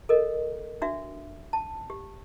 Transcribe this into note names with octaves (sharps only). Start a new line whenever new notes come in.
A4 A#4 D#5
D4 F#4 E5
A5
G4